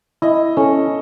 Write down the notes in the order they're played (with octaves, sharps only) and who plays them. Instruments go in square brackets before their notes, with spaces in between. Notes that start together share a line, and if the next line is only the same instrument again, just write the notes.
[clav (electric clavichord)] E4 [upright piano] D#5
[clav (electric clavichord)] C#4 [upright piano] A4